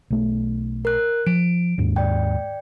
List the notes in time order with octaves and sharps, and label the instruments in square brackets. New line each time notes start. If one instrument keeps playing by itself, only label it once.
[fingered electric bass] B1 A3
[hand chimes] A#4 F#6
[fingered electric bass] F3 [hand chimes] D7
[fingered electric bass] D#2 G#2
[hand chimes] D5 G5